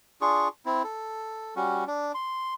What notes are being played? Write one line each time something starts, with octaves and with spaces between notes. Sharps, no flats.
D4 F4 G#4 C#6
C4 E4
A4
G3 C#4 F#4
D4
C6